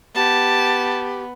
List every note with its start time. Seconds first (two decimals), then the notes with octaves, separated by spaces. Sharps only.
0.15 B3 G4 A5